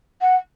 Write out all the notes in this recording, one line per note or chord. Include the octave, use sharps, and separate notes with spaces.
F#5